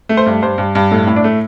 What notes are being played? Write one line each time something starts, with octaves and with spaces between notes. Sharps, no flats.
A3
C5
G2
G2 C5
G2
G2
A2 A4
A2
D4
A3